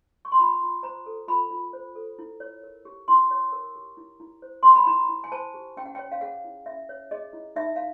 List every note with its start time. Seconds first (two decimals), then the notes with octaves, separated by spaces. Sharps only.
0.25 C#6
0.32 C6
0.39 F4 B5
0.62 F4
0.83 C5 A#5
1.06 A4
1.28 F4 B5
1.51 F4
1.73 C5
1.96 A4
2.19 E4
2.40 C#5
2.63 A#4
2.85 G4
3.08 E4 C6
3.31 C#5
3.52 A#4
3.76 G4
3.97 E4
4.20 E4
4.42 C5
4.63 G4 C6
4.75 B5
4.87 E4 A#5
5.09 E4
5.24 G#5
5.32 C5 A5
5.54 G4
5.77 C#4 G5
5.86 F#5
5.95 C#5 G5
6.12 F5
6.21 G#4 F#5
6.44 E4
6.66 C#4 E5
6.89 C#5
7.11 G#4 D#5
7.33 E4
7.56 D#4 E5
7.76 F5